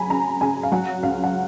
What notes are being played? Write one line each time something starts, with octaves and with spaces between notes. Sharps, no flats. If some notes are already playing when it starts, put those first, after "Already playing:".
Already playing: C#3 F#3 G#5 A#5 B5
C#3 A#5
C#3 G#5
F5
F#3 F#5
C#2 F5
F#5